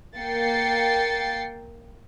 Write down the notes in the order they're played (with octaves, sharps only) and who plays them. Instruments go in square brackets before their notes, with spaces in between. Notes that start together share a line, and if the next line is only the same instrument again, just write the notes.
[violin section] A#3 G5 A6 C7 C#7